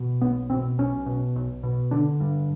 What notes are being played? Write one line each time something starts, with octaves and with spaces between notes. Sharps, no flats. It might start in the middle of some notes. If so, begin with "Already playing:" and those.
Already playing: B2
B1 B3
B2 C4
B1 C#4
B2
B1
B2
D3 D4
G2